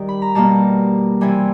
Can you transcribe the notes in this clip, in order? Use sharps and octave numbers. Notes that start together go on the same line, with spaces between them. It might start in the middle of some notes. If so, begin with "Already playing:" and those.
Already playing: D#3 G3
B5
A#5
B2 G3 A#3 A5
C3 E3 G3 G#5